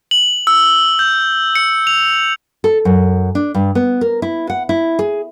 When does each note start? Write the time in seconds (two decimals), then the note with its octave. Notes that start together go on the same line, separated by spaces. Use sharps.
0.11 F#7
0.47 E6
0.99 G6
1.55 C#7
1.87 F7
2.64 A4
2.85 F#2
3.35 D4
3.54 G2
3.75 B3
4.01 A#4
4.22 E4
4.50 F#5
4.69 E4
4.99 G#4